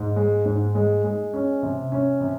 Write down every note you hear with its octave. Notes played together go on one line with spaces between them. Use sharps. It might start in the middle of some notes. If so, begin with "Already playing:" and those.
Already playing: G#2
G#3
G#2
G#3
G#3
C#4
C3
C#4
C3